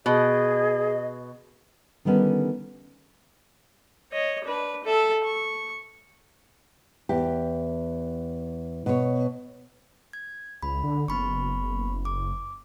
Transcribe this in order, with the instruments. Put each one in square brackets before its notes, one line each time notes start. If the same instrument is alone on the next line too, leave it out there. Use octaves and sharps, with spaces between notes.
[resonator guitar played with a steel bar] B2 [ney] G#4 [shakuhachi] D#5
[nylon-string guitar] D3 D#3 G3 B3 C#4
[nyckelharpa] C#5 D#5
D4 B4
A4 E5
C#6
[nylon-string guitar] E2 G4
B2 C#5
[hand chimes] G#6
[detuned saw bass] C#2 [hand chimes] B5
[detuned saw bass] D3
[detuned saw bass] F#1 [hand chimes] B3 B5 C#6
[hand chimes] D6